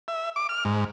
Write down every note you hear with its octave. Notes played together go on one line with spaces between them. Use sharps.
E5
D6
F6
G#2